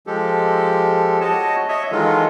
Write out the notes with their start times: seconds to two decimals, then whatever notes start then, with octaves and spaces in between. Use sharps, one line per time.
0.07 F3 G#3 G4 A4
1.21 F#4 C#5 D#5 A5
1.69 C#5 D#5 E5
1.92 D#3 E3 F#3 G#3 F4 A4